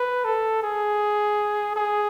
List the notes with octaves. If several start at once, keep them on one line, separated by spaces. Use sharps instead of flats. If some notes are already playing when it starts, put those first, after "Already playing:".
Already playing: B4
A4
G#4
G#4